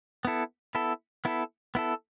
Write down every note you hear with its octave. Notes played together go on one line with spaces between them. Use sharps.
B3 E4 A4
B3 E4 A4
B3 E4 A4
B3 E4 A4